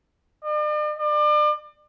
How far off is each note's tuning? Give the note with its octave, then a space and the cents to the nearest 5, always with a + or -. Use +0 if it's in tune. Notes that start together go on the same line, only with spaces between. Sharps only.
D5 +45
D5 +35